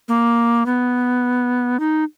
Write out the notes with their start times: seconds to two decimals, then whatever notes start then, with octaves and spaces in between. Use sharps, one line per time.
0.08 A#3
0.66 B3
1.80 D#4